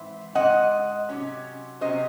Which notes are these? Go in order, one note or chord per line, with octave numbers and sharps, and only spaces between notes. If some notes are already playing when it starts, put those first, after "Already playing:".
Already playing: G#2 E3 C4 E5
G#2 E3 C4 D#5 F#5
C3 F#3 C#4
C3 F#3 C#4 C5 D#5